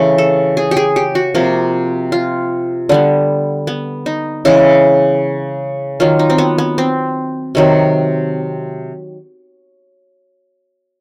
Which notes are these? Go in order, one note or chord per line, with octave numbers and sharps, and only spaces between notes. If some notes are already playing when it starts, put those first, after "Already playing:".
Already playing: C#3 E3 A3
A4
G#4
G4
G#4
G4
F#4
C3 F3 A#3
F4
D3 G3 B3
B3
D#4
C#3 E3 G#3 E4
D#3 F#3 A#3 F4
D#4
C4
B3
B3
C4
C3 D#3 F#3